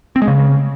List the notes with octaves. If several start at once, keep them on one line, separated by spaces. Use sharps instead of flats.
C4
G#3
C#3